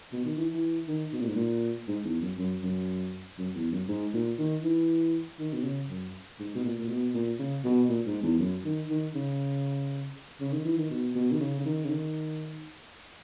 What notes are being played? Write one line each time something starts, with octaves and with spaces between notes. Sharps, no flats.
B2
D#3
E3
E3
D#3
B2
A#2
G#2
A#2
G#2
E2
F#2
F#2
F#2
F#2
E2
F#2
G#2
A#2
D#3
E3
D#3
B2
C#3
F#2
G#2
B2
A#2
A#2
B2
A#2
C#3
B2
A#2
G#2
E2
F#2
D#3
D#3
C#3
C#3
D#3
E3
D#3
B2
B2
D#3
C#3
C#3
D#3
C#3
D#3